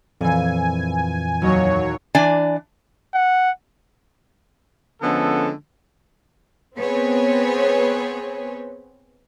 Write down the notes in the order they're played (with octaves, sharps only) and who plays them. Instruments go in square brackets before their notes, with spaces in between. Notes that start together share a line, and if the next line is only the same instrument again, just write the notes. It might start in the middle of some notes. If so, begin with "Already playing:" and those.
[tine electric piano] F2 [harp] A#2 E3 [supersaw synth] G#5
[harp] D#2 D#5 [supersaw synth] F#3 C#5
[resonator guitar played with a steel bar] E3 D4 D5 G#5
[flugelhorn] F#5
[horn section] D3 F3 G#3 B3 C#4 A4
[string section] B3 C4 G#4 B4 C#5